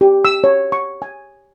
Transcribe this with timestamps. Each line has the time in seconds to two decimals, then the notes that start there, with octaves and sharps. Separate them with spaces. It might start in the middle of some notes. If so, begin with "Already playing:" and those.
0.01 G4
0.25 E6
0.44 C#5
0.72 C#6
1.02 G#5